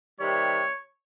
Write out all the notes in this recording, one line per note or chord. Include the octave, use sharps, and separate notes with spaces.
C3 D#3 G3 C#5